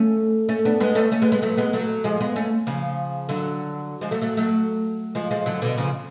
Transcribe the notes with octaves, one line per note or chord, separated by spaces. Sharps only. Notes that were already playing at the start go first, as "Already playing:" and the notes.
Already playing: A3 C#4
A3 C#4
B3 D4
G#3 B3
A3 C#4
A3 C#4
G#3 B3
G#3 B3
F#3 A3
G#3 B3
F#3 A3
F3 G#3
G#3 B3
A3 C#4
C#3 F3
D3 F#3
F3 G#3
F#3 A3
F#3 A3
F#3 A3
F3 G#3
F3 G#3
D3 F#3
B2 D3
C#3 F3